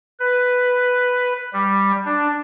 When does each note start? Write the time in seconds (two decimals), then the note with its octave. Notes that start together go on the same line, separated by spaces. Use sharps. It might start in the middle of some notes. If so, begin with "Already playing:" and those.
0.20 B4
1.53 G3
2.05 D4